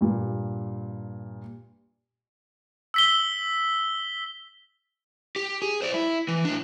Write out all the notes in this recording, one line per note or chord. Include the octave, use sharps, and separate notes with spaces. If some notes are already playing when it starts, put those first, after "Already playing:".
G2 A#2
E6 B6 G7
G4
G#4
C5 D5
E4
E3
A2 D4